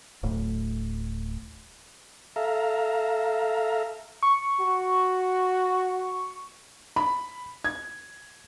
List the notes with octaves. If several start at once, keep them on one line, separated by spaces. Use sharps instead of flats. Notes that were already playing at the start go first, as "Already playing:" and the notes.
D1 A2
A4 E5 F5 A#5
C#6
F#4
B5
G#6